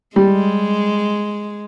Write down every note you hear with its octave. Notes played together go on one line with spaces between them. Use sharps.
G3 G#3